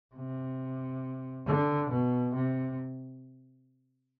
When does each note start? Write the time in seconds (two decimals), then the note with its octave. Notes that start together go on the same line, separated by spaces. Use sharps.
0.15 C3
1.46 D3
1.90 B2
2.35 C3